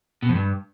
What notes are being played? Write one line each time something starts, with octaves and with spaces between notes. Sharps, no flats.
B2
F2
G2